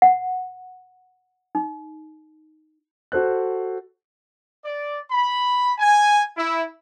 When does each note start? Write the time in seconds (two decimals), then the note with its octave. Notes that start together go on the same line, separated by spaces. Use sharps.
0.02 F#5
1.55 D#4
3.12 F#4 A4 C5 F#6
4.65 D5
5.11 B5
5.78 G#5
6.37 E4